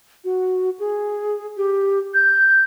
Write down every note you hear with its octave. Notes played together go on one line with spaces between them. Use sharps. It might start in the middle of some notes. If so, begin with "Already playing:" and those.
F#4
G#4
G4
G6